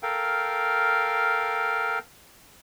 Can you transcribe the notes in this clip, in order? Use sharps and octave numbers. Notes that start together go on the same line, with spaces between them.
A4 A#4 F5 G5